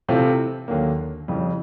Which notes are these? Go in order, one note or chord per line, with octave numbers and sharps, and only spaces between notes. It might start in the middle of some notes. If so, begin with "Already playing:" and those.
C3 E3 A3 C4 F4
D#2 D3 F#3 A#3
F2 C#3 E3 G3